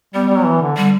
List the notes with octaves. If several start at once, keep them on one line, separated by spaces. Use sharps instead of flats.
G3 B3
G3
F#3
E3
D3
D3 G3